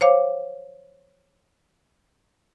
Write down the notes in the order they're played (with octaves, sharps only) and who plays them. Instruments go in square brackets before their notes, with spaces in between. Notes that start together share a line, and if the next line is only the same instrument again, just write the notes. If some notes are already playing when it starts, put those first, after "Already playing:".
[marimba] C5 C#5 F5 D6